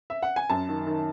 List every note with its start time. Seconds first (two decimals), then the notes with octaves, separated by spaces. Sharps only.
0.10 E5
0.23 F#5
0.36 G#5
0.50 F#2 A5
0.69 D#3
0.87 D#3